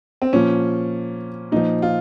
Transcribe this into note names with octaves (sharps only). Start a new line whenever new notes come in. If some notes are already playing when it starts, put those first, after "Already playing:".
C4
A#2 F3 C#4
A#2 F3 D#4
F4